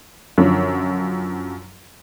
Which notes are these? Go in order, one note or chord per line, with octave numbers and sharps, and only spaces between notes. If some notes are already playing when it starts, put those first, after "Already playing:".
F#2 D3 F3